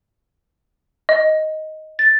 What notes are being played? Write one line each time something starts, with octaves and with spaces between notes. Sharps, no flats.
D#5
A6